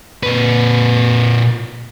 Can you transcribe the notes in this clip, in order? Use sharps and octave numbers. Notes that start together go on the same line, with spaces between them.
A#2 B4